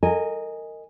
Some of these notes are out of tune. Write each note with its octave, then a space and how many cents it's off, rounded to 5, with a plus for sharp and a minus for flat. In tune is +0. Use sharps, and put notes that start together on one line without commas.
A#4 -25 D#5 +0 G#5 -10